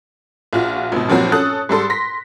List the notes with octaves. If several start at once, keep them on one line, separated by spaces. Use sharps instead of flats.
A#1 F4 F#4
G#1 B2
G2 A#2 F3 F#3 C4 F#4
C#4 A4 D#6 F#6
G#2 G3 A4 C6
C6 A#6 B6